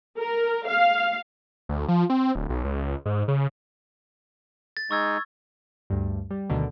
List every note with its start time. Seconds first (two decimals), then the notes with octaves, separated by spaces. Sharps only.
0.19 A#4
0.68 F5
1.69 D2
1.88 F3
2.10 C4
2.35 D1
2.49 B1
2.64 C#2
3.06 G#2
3.28 C#3
4.77 A6
4.91 G#3 D#4 C#6 E6 G#6
5.90 D2 G2
6.31 G3
6.50 D2 B2 D3 D#3